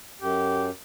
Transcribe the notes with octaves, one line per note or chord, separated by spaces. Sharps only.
F#2 G4